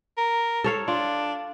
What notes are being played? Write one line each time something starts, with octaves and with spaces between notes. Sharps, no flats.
A#4
A4 C#5 F5
D4 F4